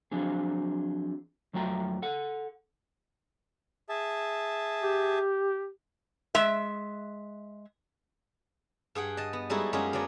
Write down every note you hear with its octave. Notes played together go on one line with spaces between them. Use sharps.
F3 F#3 C4 D4 G#4
F2 F#3 A3 F4 G5 A#5
A4 F#5
G#4 E5 A5
G4
G#3 E5
G2 G#4 F#5 G5
D#5 A5
B3
G3 G#3 D#4 E4 F#4 A4
F#2 G#3 C#4 F4 G4 G#4
F#3 B3 D4 D5